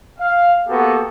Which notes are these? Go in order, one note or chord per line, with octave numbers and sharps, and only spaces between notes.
F5
A#3 B3 F#4 G4 A4